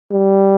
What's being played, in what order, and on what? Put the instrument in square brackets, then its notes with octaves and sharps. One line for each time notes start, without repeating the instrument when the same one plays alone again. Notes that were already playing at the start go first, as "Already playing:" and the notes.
[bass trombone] G3